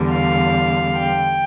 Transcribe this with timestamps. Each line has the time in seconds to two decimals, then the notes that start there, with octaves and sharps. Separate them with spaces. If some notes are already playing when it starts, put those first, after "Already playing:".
Already playing: E2 D3 G3
0.14 F5
1.00 G5